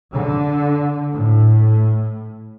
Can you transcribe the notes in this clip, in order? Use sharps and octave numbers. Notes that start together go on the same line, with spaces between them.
D3
A2